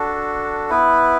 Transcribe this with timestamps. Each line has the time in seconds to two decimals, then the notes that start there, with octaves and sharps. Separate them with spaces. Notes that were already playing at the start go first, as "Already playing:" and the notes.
Already playing: D4 F#4 A4
0.70 B3 E4 B4